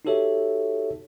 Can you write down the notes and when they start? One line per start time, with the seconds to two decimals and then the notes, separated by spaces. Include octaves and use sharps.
0.05 D#4 F#4 G4 A4 C#5 E5